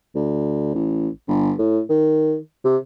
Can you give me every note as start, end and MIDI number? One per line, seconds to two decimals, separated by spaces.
0.15 0.74 38
0.74 1.08 33
1.28 1.53 31
1.59 1.81 45
1.89 2.36 51
2.64 2.77 48